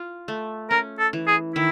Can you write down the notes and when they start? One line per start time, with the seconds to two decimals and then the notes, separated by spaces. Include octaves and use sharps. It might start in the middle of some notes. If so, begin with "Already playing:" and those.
Already playing: F4
0.28 A3
0.71 C#4 A#4
0.99 A4
1.13 E3
1.28 G#4
1.55 D#3 E4